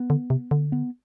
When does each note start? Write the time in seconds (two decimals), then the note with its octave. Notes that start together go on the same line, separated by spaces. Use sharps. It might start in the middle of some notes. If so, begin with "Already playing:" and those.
Already playing: B3
0.10 D3
0.30 C3
0.51 D3
0.72 B3